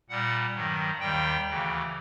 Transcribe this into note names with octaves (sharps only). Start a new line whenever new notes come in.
A#2 G3 F#5
G2 D#3 F#3
D#2 D#3 G3 G5
D2 C#3 E3